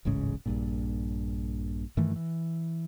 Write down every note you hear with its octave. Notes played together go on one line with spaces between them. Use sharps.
D1 A1 G#2 C#3
A#1 G2 A#2
G2 D#3 E3 A3
E3